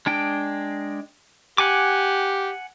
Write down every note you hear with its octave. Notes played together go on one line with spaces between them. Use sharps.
G#3 D4 G5
G4 F#5 G#5 D6